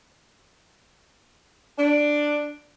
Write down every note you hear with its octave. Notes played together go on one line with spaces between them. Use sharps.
D4